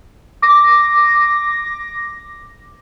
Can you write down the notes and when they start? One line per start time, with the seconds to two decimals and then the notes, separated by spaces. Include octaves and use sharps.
0.42 D6 A#6